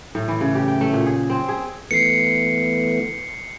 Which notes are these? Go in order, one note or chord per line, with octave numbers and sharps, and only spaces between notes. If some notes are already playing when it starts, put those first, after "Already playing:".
A2
E3
C#3
G4
G5
A3
A#2
G#4
C4
G#4
E3 A3 B3 C7 C#7